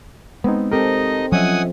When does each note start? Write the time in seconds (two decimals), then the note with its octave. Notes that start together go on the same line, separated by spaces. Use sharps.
0.44 G#3 B3 C4 D#4
0.72 C4 D#4 G4 A4 A#4 D#5
1.32 F3 F#3 C#4 D#5 E5 F#5 G#5 D#6